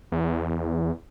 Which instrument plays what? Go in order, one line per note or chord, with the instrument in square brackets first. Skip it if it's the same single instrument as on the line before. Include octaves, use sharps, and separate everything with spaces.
[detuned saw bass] E2